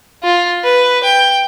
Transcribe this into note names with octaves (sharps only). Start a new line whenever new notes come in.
F4
B4
G5